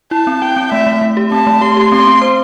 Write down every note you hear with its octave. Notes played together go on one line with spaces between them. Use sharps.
E4 A5
C4
E4 G5
C4
A3 E5
A3
A3
G4
C4 A5
A3
G4 C6
G4
C4 C6
C4
C5